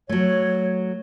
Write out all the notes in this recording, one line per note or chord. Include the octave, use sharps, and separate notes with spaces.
F#3 A3 C#5